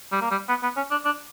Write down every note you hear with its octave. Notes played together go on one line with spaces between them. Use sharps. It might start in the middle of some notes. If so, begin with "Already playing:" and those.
G3
A#3
G3
B3
B3
C#4
D4
D4